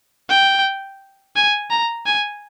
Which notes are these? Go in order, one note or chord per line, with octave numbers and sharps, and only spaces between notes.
G5
G#5
A#5
G#5